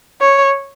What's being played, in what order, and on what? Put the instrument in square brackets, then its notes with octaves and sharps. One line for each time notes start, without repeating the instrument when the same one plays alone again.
[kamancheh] C#5